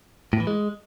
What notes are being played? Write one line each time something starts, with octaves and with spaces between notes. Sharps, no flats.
A2
E3
G#3